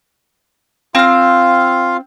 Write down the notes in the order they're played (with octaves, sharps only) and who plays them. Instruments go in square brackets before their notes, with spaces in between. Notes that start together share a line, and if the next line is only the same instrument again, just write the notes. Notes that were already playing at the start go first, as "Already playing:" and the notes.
[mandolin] C4 F6 [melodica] F4 F5